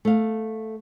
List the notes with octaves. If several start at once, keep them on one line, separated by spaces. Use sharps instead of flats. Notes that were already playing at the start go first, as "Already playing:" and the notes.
A3 F5